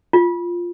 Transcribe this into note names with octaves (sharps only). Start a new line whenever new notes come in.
F4